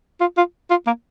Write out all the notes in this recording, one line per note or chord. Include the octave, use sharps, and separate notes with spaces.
F4
F4
F4
A#3